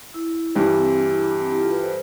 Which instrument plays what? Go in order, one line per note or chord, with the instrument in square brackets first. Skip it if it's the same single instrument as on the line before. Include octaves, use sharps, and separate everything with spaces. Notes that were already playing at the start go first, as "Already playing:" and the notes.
[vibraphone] E4
[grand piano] G2 E3 G3 [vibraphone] D4
[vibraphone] C4
D4
E4
D4
B3
C4
E4 G4
F4 A4
G4 B4
A4 C5